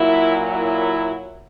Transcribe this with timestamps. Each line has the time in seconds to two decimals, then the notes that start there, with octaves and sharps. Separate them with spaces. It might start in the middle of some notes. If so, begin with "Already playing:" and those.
Already playing: A#2 F#3 E4
0.42 E4